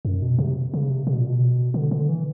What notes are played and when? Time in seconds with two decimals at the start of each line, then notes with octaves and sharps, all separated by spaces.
0.05 F#2
0.22 B2
0.38 C3
0.74 C#3
0.90 C3
1.07 C3
1.14 B2
1.20 A#2
1.28 B2
1.74 D3
1.91 D3
2.09 E3